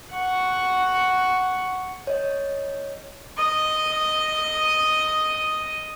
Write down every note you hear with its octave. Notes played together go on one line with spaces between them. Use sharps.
F#5 C#6
C#5 D#5
D#5 D#6